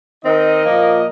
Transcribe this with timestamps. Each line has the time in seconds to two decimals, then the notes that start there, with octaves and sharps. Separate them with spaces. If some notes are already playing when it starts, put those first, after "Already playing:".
0.24 D#3 C4 D#4 A#4 D#5
0.64 A#2 F3 A#3